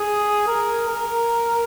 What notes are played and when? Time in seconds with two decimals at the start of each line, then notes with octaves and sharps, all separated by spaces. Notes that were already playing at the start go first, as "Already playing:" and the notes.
Already playing: G#4
0.47 A#4
0.88 A#4